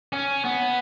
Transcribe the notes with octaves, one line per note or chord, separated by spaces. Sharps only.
C#4
B3